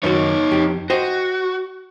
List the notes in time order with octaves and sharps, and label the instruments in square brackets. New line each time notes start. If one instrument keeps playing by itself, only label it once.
[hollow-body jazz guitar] F#2 D#3 F#4 [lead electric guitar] D#4 C#5
[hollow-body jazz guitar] F2 G4
[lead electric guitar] F#4 [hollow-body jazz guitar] C5 D#5 G5